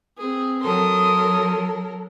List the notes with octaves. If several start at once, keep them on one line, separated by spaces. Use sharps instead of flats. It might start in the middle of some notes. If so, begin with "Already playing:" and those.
C4 G#4
F#3 A4 A#4 C6 D#6